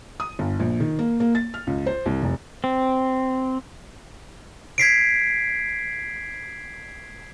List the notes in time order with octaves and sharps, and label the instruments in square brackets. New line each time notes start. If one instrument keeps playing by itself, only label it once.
[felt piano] D#6
G1
A#1
D#3
A#3
A#3
A6
F6
C#2
C5
C2
F1
[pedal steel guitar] C4
[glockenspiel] G#6 B6 C7 D7